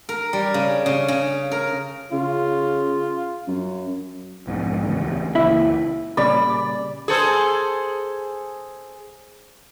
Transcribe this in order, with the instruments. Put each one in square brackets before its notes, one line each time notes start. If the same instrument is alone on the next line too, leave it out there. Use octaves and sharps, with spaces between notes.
[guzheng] A#4
G3
C#3
C#3
C#3
A#4
[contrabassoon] C#3 [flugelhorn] F4
[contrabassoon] F#2
[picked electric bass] B1 F2 G#2
D1 E2 C#3
[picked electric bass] C#2 A#2 E3 [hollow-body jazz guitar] E4 E5
[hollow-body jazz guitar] A#2 C#3 G3 [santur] D5 [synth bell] B5
[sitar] G#4 A4 C5